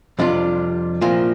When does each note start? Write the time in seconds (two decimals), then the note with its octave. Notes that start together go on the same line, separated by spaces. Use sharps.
0.19 F2 C3 G3 D4 F4
1.01 C2 A#2 F3 A#3